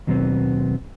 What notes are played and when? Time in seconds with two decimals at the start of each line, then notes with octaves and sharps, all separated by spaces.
0.07 D#2 B2 F#3 B3 C4